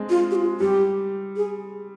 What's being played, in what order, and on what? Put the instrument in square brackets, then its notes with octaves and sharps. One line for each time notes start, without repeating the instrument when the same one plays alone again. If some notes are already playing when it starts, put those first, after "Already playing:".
Already playing: [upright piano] G#3 C4 D4
[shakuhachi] F4
G4
F4
[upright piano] G3 [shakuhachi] G4
[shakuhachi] G#4